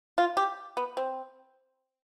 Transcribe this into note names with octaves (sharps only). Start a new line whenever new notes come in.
F4
G4
B3
C4